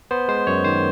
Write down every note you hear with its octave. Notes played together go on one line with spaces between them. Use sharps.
B3 C5
G#3 C5
F#2 C#5
D#3 C5